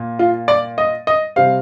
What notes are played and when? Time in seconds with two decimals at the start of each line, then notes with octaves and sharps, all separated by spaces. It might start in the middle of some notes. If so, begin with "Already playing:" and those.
Already playing: A#2
0.19 F4
0.48 D5
0.78 D#5
1.07 D#5
1.36 C3 G3 C4 F5